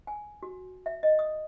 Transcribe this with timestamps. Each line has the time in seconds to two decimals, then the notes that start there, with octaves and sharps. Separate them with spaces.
0.07 G#5
0.43 F#4
0.86 E5
1.03 D#5
1.19 D#6